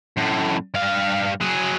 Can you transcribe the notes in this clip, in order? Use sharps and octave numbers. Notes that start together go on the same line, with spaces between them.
F#2 A2
G2 F5
F#3 G#4